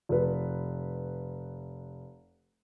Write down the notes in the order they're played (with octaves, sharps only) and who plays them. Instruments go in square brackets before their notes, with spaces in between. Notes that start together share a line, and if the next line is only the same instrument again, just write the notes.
[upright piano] F1 B4